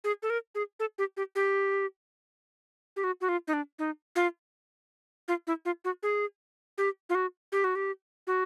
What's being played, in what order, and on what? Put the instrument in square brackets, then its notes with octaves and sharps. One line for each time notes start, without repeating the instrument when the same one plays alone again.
[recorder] G#4
A4
A#4
G#4
A4
G4
G4
G4
G4
F#4
F#4
F4
D#4
D4
D#4
F4
F4
E4
F4
F#4
G#4
G4
F4
F#4
G4
F#4
G4
F#4